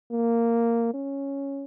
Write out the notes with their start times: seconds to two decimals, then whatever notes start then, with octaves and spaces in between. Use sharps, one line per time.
0.11 A#3
0.94 C#4